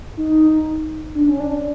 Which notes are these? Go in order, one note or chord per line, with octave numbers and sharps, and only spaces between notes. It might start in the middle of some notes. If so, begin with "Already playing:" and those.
D#4
D4
C#4
D4